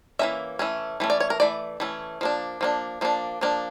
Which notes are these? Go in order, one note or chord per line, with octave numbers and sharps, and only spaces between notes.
E3 A#3 C#4 E5
E3 A3 C#4
E3 A3 C#4
D5
C#5
A#4
E3 A3 D5
E3 A3 C#4
F3 A#3 D4
F3 A#3 D4
F3 A#3 D4
F3 A#3 D4